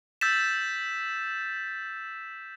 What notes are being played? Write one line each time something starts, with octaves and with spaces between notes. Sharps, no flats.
E6 G6 A6 B6 E7